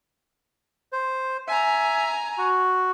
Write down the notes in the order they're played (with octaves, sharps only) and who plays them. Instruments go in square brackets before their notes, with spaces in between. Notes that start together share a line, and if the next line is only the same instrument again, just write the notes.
[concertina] C5
[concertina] E5 [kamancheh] G#5 A#5
[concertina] F#4